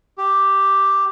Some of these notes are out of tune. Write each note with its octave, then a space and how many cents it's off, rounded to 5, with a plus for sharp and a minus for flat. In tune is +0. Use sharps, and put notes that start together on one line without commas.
G4 +0